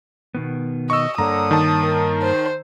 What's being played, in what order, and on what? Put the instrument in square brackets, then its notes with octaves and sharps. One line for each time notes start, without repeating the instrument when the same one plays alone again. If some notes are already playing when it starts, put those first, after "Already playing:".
[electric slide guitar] B2 D#3 B3
[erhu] D#5 [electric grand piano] C#6 E6
[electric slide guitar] G2 A#3 C#5 [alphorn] D3 [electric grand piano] A#5 [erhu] D#6
[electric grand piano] D#3 A5
[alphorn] A#4
[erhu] C5